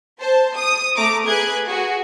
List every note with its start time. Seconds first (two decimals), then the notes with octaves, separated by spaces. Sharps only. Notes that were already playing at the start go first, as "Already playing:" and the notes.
0.19 C5 A5
0.54 D#6
0.96 A3 A#5 D6
1.27 G#4 B4 F#6 G#6
1.65 F#4 G#4